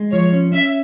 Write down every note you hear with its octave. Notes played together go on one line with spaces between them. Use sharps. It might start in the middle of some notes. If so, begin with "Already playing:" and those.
Already playing: G#3
F3 C#5
C#4
C#4 E5